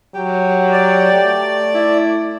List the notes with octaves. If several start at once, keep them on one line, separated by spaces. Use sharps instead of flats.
F#3 G4
D5
A3
E4